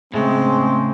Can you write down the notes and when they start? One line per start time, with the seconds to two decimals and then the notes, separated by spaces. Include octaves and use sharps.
0.14 A2 C#3 G#3 C4